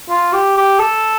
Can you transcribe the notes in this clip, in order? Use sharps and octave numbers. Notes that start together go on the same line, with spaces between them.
F4
G4
G4
A4